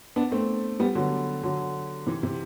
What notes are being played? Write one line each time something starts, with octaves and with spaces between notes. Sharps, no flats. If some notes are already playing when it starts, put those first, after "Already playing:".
B3 D4
A3 C4
G3 B3
D3 F#3
D3 F#3
C3 E3
C3